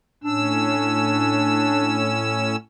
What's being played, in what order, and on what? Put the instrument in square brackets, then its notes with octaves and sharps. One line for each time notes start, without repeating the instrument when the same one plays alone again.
[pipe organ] A2 C#4 E6 [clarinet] D4